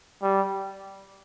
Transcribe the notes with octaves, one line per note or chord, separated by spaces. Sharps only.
G3